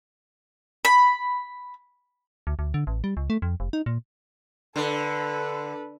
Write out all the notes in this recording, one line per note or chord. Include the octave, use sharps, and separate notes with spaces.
B5
D2
D2
D3
A1
G3
C#2
A3
F2
F1
D#4
A#2
D3 A4 B4